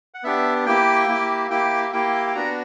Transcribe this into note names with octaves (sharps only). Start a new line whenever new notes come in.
F#5
B3 D4 G4 E5
A#3 E4 G4 G5
A#3 E4 G4
A#3 E4 G4 G5
A#3 E4 G4 G5
G5
B3 D4 F#4 A#5